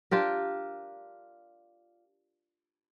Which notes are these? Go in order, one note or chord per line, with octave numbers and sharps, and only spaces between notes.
D4 F4 G4 A#4